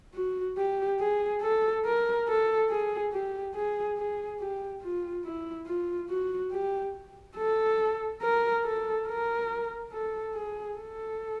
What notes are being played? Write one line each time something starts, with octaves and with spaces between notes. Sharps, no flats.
F#4
G4
G#4
A4
A#4
A4
G#4
G4
G#4
G#4
G4
F4
E4
F4
F#4
G4
A4
A#4
A4
A#4
A4
G#4
A4